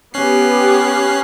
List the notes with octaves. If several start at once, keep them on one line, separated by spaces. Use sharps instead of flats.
B3 C#4 G4 F#6 C7